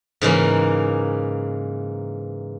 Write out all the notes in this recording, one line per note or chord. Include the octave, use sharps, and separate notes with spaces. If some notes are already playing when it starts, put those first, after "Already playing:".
G#2 C#3 E3 A#3